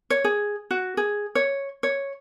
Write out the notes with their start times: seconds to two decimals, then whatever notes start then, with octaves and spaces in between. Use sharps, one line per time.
0.10 C#5
0.24 G#4
0.71 F#4
0.97 G#4
1.35 C#5
1.83 C#5